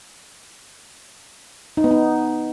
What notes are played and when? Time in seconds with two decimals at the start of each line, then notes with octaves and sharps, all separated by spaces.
1.77 D#4
1.84 B3
1.91 D#4